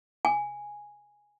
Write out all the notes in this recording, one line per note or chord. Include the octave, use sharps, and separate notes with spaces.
G#5